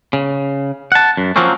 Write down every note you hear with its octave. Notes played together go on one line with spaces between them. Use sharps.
C#3
F#5 A5
F#2
F3 F#3 A#3 C4 C#4